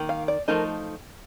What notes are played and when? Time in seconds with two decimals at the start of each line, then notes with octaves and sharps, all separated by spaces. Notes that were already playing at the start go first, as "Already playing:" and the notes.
Already playing: D#3 A#3
0.09 F5
0.28 D5
0.48 F3 A3 D#4 A#4